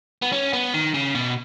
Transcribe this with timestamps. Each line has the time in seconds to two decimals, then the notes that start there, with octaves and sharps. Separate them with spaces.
0.22 B3
0.32 C#4
0.53 B3
0.74 D#3
0.94 C#3
1.15 B2